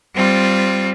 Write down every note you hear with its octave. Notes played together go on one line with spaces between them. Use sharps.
G3 C4 F4